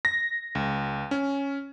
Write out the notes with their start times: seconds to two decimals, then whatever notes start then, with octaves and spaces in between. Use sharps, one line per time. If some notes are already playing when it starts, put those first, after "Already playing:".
0.05 A#6
0.55 C#2
1.11 C#4